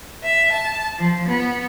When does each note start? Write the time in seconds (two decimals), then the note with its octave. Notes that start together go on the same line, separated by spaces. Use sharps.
0.23 E5
0.52 A5
0.98 F3
1.28 B3